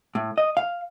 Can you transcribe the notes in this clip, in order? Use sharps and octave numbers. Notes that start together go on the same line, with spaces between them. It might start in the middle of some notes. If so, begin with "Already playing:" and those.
A2
D#5
F5